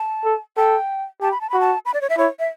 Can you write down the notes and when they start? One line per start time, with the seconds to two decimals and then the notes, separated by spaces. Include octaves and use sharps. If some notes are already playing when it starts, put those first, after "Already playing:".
Already playing: A5
0.25 A4
0.57 A4 G5
1.21 G4 A5
1.31 B5
1.41 A5
1.50 F#4 B5
1.61 A5
1.86 B5
1.94 D5
2.01 C#5
2.10 E5
2.17 E4 C#5
2.39 E5